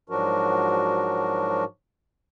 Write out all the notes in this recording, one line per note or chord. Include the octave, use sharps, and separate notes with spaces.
G#2 F3 F#3 D4 F#4 A#4